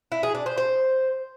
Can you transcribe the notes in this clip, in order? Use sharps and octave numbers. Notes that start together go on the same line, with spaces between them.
E4
G#4
D4
C5
C5